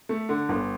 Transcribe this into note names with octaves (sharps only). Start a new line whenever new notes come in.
A3
D3
G1